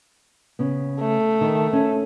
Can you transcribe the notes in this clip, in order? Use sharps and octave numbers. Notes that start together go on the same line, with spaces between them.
C#3 B3
A3
D#3
C#4